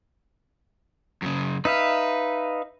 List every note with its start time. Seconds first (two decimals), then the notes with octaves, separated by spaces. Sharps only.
1.22 F#2 C#3
1.65 D#4 B4 E5 F5